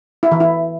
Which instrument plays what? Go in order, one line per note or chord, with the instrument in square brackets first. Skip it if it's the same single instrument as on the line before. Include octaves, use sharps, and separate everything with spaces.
[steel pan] E4
E3
E4